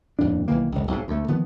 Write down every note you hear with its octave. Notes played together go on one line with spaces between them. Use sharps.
D#1 F2 A2 D4
B1 D#3 E3 A#3
E1 C#2
B1 G#2
D2 A3
D#3 F3 B3